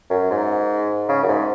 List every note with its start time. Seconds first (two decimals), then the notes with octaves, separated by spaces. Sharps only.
0.10 F#2
0.31 G#2
1.09 C#3
1.23 F#2
1.28 G#2